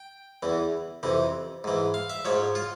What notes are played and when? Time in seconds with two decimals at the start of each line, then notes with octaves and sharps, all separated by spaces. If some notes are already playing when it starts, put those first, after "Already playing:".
Already playing: G5
0.43 E2 E3
1.03 F2 C3 E3
1.64 G#2 E3
1.94 F5
2.10 E5
2.25 G#2 F3 C#5
2.55 F4